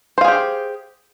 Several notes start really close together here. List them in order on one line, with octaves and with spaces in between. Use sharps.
C5 F5 G#4 G4